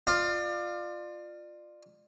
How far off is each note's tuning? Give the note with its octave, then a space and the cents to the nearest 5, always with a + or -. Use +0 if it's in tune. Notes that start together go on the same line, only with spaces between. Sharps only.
F4 +0 D5 +30